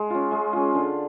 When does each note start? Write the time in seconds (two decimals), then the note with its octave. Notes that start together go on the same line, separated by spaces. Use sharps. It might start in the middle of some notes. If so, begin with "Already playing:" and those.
Already playing: G#3
0.10 C#4 F4
0.31 G#3
0.53 C#4 F4
0.75 D3